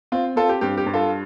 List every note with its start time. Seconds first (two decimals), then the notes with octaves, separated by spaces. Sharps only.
0.12 C4 F4
0.36 C4 F4 A4
0.49 G4
0.61 G2 G4
0.78 G4
0.86 G2
0.94 F4 A4